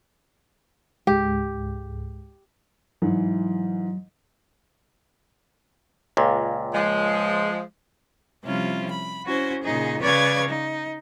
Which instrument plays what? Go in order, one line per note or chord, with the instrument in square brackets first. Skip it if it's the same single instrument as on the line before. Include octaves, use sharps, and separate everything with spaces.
[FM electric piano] C#2 G#2 G#3 [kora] G4
[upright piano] G#2 E3 [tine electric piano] F#3
[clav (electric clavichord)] C#2 A#2
[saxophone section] F3 G#3
[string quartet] C3 F3 G3 C#4 E4 F4
B5
C#4 E4 F#4 C5
A#2 C#3 D#4 G#4
C#3 B4 C#5 D5 F5 G#6
D#4